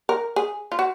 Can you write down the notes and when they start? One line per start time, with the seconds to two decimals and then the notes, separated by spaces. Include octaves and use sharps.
0.09 A#4
0.36 G#4
0.72 F4
0.79 F#4